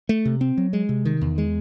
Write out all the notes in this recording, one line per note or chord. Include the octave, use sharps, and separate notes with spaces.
A3
C3
C4
F#3
G#3
C3
D#3
E2
G#3